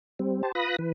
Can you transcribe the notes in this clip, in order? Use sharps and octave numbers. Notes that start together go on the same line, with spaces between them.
G3 C4
G4 C5 A5
F4 B4 B5 D#6 F#6 A#6
E3 B4